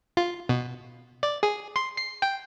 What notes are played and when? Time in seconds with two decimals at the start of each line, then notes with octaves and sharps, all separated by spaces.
0.17 F4
0.49 B2
1.23 D5
1.43 G#4
1.76 C6
1.97 C7
2.22 G5